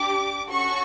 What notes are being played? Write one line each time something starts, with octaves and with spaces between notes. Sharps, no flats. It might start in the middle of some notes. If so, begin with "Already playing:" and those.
Already playing: D4 G4 D6
C#4 F#4 A4 C#6